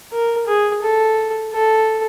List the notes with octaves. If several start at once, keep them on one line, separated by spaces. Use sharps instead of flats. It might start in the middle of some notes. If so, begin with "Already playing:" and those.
A#4
G#4
A4
A4